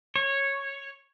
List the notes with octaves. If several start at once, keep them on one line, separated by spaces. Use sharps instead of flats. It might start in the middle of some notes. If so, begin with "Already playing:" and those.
C#5